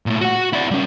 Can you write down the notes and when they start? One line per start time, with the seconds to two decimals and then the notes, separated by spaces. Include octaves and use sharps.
0.06 A#2 A3
0.21 F#4 F#5
0.53 E4 D5
0.71 G3 C#4